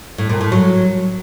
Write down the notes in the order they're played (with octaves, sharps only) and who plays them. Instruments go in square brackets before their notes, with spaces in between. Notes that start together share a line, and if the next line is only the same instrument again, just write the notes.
[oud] A2
A#2
A2
F#3